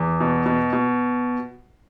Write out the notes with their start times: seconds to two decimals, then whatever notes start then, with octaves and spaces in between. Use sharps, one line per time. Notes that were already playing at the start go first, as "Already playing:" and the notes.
Already playing: E2
0.20 B2
0.46 B2
0.73 B2